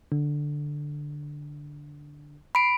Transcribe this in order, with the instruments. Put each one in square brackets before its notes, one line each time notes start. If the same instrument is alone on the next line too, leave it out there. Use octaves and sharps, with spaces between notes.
[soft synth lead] D3
[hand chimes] B5 D7 [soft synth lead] C7